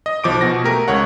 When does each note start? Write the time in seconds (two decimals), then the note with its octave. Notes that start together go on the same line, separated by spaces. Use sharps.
0.06 D#5
0.24 B1 F3 D6 D7
0.41 B2 F#4 A#6
0.64 A3 G4 A#4
0.88 C#2 C#5 F#5